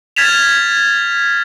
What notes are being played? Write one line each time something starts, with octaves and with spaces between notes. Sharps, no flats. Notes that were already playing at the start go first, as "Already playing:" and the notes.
F6 G#6 A6 B6 E7 F7